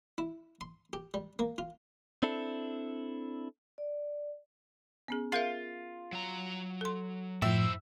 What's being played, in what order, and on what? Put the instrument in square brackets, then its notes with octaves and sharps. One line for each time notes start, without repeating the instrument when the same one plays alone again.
[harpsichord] E4
C6
G4
G3
A#3
F4
[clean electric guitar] C4 D4 E4 A4
[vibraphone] D5
[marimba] B3 C#4 G#4
[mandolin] F4 [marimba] G#4 A#4 E5
[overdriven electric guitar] F#3 A#5
[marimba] A4 C6
[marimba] F#2 [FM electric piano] A2 F3 [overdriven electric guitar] E4 C5 [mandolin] E5